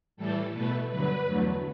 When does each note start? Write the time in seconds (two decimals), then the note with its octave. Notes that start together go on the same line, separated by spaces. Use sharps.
0.17 A2 E3 G3 A4
0.53 B2 A3 B4
0.89 G2 D3 F#3 B4
1.26 E2 D3 F#3 A3